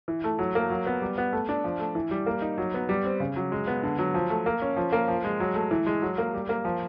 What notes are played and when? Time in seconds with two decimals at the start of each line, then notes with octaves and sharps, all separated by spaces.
0.08 E3
0.24 A3
0.39 F#3
0.55 A#3
0.70 F#3
0.87 B3
1.02 G3
1.18 B3
1.33 A3
1.49 D4
1.64 F3
1.79 A3
1.95 E3
2.11 G3
2.26 A#3
2.42 D#4
2.58 F#3
2.74 B3
2.89 G3
3.05 C4
3.20 C#3
3.36 F#3
3.52 G#3
3.68 B3
3.83 D3
3.99 F#3
4.14 F3
4.30 A3
4.46 A#3
4.62 C#4
4.77 F3
4.93 A#3
5.08 F3
5.24 G#3
5.40 F#3
5.55 A3
5.71 E3
5.87 G#3
6.02 F#3
6.18 A#3
6.34 G3
6.49 A#3
6.65 F3